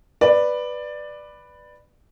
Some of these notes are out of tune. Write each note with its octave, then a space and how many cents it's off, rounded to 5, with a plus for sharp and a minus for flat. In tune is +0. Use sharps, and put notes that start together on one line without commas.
B4 +0 D5 +10